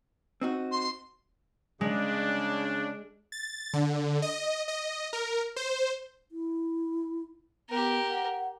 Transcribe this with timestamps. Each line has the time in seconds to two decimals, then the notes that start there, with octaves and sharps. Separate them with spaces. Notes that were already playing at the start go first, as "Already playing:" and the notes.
0.41 C4 D#4 F#4
0.71 C6
1.81 C#3 G#3 D4
3.32 A6
3.74 D3
4.22 D#5
4.68 D#5
5.13 A#4
5.56 C5
6.31 E4
7.70 B3 G4 A#4
8.09 F#5